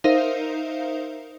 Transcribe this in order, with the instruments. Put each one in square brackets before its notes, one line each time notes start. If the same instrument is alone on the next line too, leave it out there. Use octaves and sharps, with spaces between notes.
[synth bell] D#4 A#4 C5 E5 F5